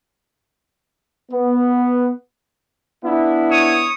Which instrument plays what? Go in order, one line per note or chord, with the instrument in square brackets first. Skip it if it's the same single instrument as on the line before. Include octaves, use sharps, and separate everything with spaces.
[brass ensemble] B3
[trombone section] B3 D4 E4
[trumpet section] C#5 D#6